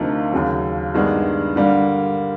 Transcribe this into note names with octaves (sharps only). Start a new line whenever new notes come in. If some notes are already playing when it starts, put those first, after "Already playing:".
Already playing: D2 C3 F3 A#3 D#4
D#2 C#3 F#3
G2 D#3 G#3 B3 D4
D3 G3 A#3